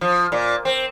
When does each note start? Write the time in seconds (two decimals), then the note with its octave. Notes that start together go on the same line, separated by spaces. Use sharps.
0.01 F3
0.32 A#2
0.65 C4